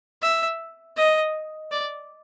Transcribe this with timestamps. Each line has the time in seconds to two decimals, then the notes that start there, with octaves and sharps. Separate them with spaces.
0.22 E5
0.97 D#5
1.71 D5